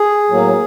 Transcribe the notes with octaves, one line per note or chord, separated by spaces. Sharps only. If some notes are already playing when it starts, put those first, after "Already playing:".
Already playing: G#4
A2 F#3 A#3